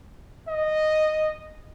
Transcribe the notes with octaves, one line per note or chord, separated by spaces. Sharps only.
D#5